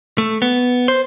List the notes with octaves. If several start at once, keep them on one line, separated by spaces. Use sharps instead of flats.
A3
B3
C5